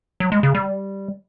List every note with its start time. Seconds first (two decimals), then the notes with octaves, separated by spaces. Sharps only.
0.20 F#3
0.32 G#3
0.43 C#3
0.55 G3